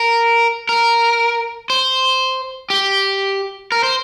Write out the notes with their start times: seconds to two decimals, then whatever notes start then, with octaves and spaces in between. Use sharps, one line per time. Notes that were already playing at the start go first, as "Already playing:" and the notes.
Already playing: A#4
0.69 A#4
1.70 C5
2.70 G4
3.72 A#4
3.83 C5